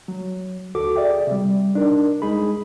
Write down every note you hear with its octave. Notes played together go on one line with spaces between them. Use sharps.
F#3
D2 F#4 A4 D6
G#4 D5 E5 G5
C3 G3
D4 D#4 A#4
C2 G#3 D#4 G#4 B5